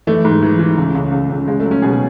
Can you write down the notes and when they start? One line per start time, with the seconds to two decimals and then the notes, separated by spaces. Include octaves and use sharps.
0.07 E3 A3
0.25 G#2
0.43 E3
0.59 E3
0.77 C#2
0.95 C#2
1.12 C#2
1.30 C#2
1.48 C#2 G#3
1.60 A3
1.65 F#3
1.71 C#4
1.82 B2 G#4